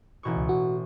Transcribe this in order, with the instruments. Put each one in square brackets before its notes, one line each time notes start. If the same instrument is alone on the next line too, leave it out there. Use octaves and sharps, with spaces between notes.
[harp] A1 B2 C#6
[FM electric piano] C#2
F#4